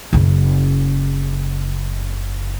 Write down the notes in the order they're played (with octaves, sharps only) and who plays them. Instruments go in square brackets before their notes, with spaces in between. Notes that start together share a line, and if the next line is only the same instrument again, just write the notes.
[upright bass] F#1 C#3